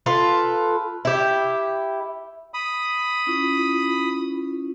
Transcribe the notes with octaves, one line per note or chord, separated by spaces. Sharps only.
F4 A4 B4
E4 G4
B5 D#6
C#4 E4 F4